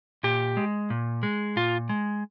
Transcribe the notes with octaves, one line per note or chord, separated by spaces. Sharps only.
A#2 G4
G#3
A#2
G#3
A#2 F4
G#3